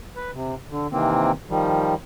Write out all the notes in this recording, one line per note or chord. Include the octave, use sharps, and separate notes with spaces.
B4
C3
D3
C3 D#3 E3 A#3 C4
D#3 F3 G3